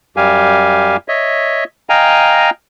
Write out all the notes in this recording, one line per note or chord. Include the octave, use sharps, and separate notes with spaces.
F#2 G3 G4 F5 G#5
C#5 D#5 E5
D#5 F5 G5 G#5 A#5